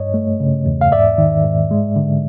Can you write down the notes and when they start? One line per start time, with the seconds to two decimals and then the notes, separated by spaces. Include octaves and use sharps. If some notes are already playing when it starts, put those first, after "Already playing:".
Already playing: G2 C#5 D#5
0.14 A3
0.40 C#3
0.66 E2
0.81 F5
0.92 G#2 D5 E5
1.18 D#3
1.44 G#2
1.71 G#3
1.96 D3